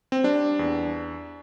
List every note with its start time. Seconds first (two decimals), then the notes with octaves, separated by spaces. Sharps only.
0.12 C4
0.24 G3 D4
0.59 E2